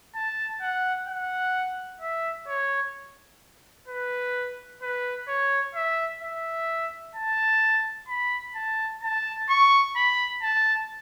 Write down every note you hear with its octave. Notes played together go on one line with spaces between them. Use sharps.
A5
F#5
F#5
E5
C#5
B4
B4
C#5
E5
E5
A5
B5
A5
A5
C#6
B5
A5